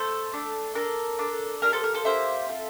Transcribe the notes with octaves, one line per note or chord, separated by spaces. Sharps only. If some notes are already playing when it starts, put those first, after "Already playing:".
Already playing: A3 A4 C5
A3 D4 A4
D4 A4 A#4
D4 A4
A#3 D4 G4 A#4
A4 C5
A#4
A4 C5
A#3 D4 G4 C5 E5
C4 F4 A4